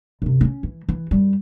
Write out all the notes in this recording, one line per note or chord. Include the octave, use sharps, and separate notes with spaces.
F#2 C3
C4 C#4
E3
E3
F#2 G3